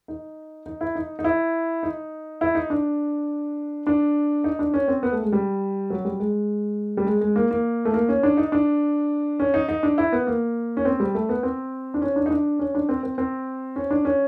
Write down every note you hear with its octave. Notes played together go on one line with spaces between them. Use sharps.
D#4
D#4
E4
D#4
D#4
E4
D#4
E4
D#4
D4
D4
D#4
D4
C#4
C4
B3
A3
G#3
G3
F#3
G3
G#3
G3
G#3
G#3
A#3
A#3
A3
A#3
C#4
D4
D#4
D4
C#4
D#4
D#4
D4
E4
B3
A#3
C#4
C4
G3
A3
B3
C4
D4
C#4
D4
D#4
D4
C#4
D4
C4
C4
C4
C#4
D4
C#4